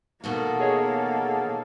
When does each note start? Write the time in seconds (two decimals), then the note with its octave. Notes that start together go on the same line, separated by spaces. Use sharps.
0.24 B2 D#3 A#3 F#4 A4
0.59 G#4 C#5 D#5